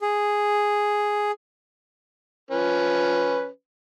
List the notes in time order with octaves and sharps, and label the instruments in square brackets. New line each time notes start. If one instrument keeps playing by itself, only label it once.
[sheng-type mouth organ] G#4
[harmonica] F3 C#4 B4